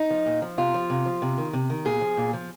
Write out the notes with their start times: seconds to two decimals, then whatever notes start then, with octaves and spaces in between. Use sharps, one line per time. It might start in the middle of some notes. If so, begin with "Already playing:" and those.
Already playing: D#4
0.10 F3
0.26 A#2
0.42 F3
0.58 C3 F4
0.74 F3
0.90 C3
1.06 F3
1.22 C3
1.38 D#3
1.53 C3
1.70 D#3
1.85 A#2 G#4
2.01 F3
2.17 A#2
2.33 F3